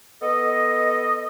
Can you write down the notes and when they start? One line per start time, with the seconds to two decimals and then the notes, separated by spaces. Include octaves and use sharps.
0.23 B3 A4 D#5